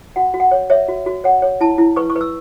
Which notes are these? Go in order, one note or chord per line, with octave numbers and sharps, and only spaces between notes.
F#4 F#5
F#4
F#5
C#5
C#5 E5
F#4
F#4
C#5 F#5
C#5
E4 A5
E4
B4 C#6
C#6
B4
E6